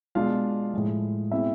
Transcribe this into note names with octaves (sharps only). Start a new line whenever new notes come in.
B2 G#3 D4 F4 F5
A2 F3 G#3
B2 G#3 C4 E4 E5